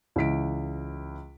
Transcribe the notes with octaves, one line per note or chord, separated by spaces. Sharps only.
C#2 E3 B6 D7